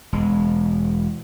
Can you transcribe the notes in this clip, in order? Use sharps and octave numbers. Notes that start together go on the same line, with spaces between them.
E1 G#3